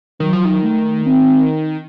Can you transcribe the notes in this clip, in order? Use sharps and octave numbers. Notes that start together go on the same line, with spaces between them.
D#3 F#3
F3
D#3
A3
C4